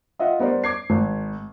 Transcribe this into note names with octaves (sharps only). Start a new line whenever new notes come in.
F4 D#5 E5 F#5
G3 B3 A#4 C5 D5
D6 G#6 C7
G#1